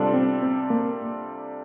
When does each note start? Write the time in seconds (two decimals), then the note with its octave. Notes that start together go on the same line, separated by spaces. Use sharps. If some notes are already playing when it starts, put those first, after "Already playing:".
Already playing: C3 G3 D4 F4 A4
0.13 C4
0.42 C4
0.70 A#3